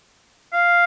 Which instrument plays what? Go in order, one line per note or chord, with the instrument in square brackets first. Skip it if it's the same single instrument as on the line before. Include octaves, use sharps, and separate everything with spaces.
[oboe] F5